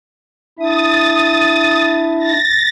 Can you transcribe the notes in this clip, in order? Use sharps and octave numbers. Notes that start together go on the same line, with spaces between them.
D4 E4 E5 D#6 A6
A6 A#6